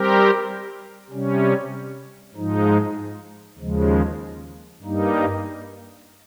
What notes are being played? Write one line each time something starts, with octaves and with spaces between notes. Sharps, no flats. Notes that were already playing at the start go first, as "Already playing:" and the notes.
Already playing: G3 C4 G4 A#4
C3 G3 C#4
G#2 F3 G#3 D#4
D#2 C#3 F3 G#3
G2 G3 A#3 D#4